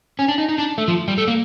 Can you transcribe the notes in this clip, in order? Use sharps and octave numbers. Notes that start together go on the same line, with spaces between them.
C#4
D4
D#4
D#4
D4
A3
F3
G3
A3
A#3